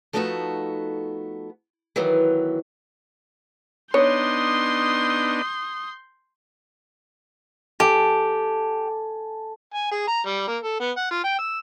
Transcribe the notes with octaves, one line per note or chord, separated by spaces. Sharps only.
F3 A3 B3 D#4 F#4 A4
D#3 E3 F#3 B3
B3 D4 D#4 C#5 C6 D#6 G6
G4 A4 G#5
G#5
G#4
A#5
G3
A#3
A4
B3
F#5
F4
G5
E6